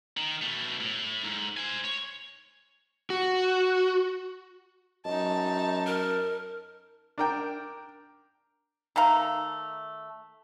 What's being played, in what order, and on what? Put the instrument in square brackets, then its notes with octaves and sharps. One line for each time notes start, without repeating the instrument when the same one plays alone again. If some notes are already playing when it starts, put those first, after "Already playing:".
[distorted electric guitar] D#3
B2 A3
A2
G#2
C5 G#5
C#5
[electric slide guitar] F#4
[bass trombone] F#2 [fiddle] D#4 A5 [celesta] D#5
[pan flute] A#4
[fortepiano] D4 A#4 G5
[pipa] D#3 A3 F5 A#5